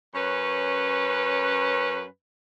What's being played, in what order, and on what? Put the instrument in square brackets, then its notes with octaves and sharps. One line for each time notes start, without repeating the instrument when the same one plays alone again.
[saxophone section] F#2 C#4 B4